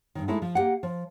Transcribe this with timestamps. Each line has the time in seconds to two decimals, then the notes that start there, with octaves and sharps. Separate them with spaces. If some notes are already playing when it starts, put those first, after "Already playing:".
0.15 G2 D#3
0.28 G#3 A3 D#4 E4 A4
0.42 F3
0.55 A#3 G4 F#5
0.83 F3